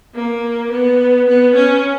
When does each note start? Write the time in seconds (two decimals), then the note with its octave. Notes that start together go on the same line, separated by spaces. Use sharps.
0.15 A#3
0.71 B3
1.28 B3
1.55 C#4